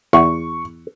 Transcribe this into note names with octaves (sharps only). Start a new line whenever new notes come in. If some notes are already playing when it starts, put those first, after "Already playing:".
E2 C#6